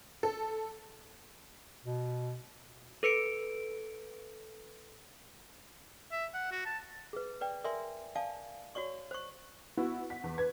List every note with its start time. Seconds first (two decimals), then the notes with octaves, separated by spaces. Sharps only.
0.23 A4
1.85 B2
3.03 A4 B4 C#7 D7
6.12 E5
6.34 F#5
6.52 F#4
6.65 A5
7.13 G#4 B4
7.41 B4 D5 G5
7.64 A#4 D5 E5 G#5 C6
8.16 D5 F5 G#5 A5
8.75 F#4 C#5 D5 C#6
9.11 C5 C#6
9.77 B3 E4 F#4
10.10 F#5 B6
10.24 E2
10.38 B4 G#6